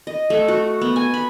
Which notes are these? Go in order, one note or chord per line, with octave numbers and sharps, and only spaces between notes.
D#5
A3
F#4
B3
G#5
B5